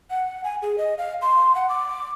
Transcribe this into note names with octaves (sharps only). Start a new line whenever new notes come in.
F#5
G#5
G#4
D#5
F5
C6
F#5
D6